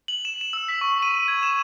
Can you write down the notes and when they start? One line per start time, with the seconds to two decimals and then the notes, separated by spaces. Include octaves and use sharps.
0.08 F#7
0.25 E7
0.41 E7
0.53 E6
0.68 B6
0.81 C#6
1.02 D#7
1.28 G#6
1.43 E7